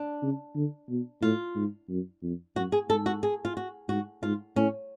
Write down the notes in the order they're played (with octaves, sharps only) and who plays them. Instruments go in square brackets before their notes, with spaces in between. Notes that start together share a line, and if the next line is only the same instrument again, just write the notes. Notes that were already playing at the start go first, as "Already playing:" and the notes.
Already playing: [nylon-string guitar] D4
[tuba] C#3
D3
B2
[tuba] A2 [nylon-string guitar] F4
[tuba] G#2
F#2
F2
[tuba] F#2 [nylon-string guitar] F#4
[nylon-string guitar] G#4
[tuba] G#2 [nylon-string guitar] A4
[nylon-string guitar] F#4
G#4
F4
F#4
[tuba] G#2 [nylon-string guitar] F#4
[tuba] G#2 [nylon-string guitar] F4
[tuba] A2 [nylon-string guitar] C#4